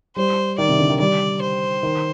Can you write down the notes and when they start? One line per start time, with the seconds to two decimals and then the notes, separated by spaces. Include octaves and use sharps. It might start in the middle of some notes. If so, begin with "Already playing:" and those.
0.16 G3 C5
0.58 D#3 D5
0.69 C3
0.79 D3
0.90 D#3
1.00 G3 D5
1.42 C5
1.83 D#3